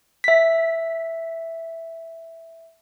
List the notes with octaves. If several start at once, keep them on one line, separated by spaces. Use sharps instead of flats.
E5 B6